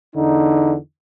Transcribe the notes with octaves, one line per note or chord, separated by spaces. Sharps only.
E2 D3 D#4